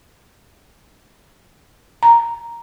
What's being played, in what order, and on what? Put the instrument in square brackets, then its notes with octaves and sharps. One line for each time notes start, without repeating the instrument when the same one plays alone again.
[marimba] A#5